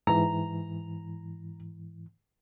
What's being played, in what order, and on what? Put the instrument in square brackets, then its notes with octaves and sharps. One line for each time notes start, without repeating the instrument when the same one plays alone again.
[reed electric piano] G#2 E3 [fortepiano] A#5